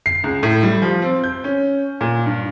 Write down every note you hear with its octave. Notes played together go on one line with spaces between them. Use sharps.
C7
C#2
A2
G3
F3
C4
G6
C#4
A#2
G2